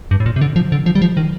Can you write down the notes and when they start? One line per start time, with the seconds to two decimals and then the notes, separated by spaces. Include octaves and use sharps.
0.11 G2
0.20 A2
0.26 A#2
0.36 C3
0.41 D3
0.56 F3
0.72 D3
0.86 F3
0.95 G3
1.02 F3
1.17 D#3